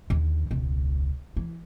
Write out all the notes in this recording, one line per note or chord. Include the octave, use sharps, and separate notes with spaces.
D#2 D3
E1 C#2
E3